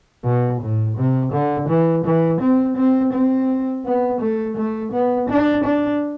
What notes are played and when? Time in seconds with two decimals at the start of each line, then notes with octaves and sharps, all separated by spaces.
0.24 B2
0.61 A2
0.97 C3
1.32 D3
1.69 E3
2.04 E3
2.41 C4
2.76 C4
3.13 C4
3.85 B3
4.21 A3
4.57 A3
4.92 B3
5.29 D4
5.64 D4